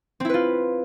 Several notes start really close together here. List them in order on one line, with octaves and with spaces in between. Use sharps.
C4 E4 B4 F4